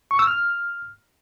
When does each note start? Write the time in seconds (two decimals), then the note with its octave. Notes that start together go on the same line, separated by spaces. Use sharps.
0.11 C#6
0.19 E6
0.27 F6